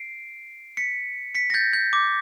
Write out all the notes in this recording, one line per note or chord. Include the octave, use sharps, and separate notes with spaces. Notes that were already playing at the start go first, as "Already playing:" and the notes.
Already playing: C7 D7
B6 C#7
B6 C#7
A#6
G6 A6
G6
D6